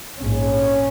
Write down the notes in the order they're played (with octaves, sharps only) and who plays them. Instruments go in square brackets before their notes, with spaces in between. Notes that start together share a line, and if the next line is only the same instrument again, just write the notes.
[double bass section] A#1 G#2 C#4